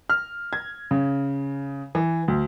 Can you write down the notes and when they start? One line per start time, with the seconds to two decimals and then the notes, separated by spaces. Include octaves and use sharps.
0.10 F6
0.53 G#6
0.91 C#3
1.95 E3
2.28 D2